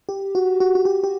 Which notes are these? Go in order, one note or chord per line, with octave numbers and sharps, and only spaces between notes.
G4
F#4
F#4
F#4
G4
G4